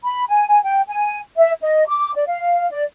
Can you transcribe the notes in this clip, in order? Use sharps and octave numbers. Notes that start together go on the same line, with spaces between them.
B5
G#5
G#5
G5
G#5
E5
D#5
D6
D5
F5
D5